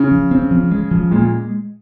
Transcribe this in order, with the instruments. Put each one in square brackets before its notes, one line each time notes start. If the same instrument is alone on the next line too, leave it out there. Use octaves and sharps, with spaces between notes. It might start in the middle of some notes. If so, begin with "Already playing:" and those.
Already playing: [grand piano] C#3
[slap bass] F3
C4
F3
G#3
F3
[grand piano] A#2 [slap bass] G#3